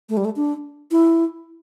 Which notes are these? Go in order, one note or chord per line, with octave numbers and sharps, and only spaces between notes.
A3
G3
A3
D4
E4